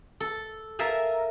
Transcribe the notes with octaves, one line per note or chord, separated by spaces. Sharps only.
A4
A#4 E5 F5 G#5 A5